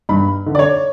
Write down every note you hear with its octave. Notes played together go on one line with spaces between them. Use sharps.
G2 B5
D3
D5
C#5